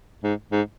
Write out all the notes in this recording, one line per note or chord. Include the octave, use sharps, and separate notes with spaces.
G#2
G#2